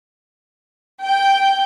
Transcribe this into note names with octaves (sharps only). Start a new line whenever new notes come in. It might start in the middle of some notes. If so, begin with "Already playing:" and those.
G5 G6